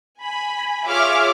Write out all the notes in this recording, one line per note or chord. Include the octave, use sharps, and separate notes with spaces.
G#5 B5
F4 G#4 C#5 E5 D6 F6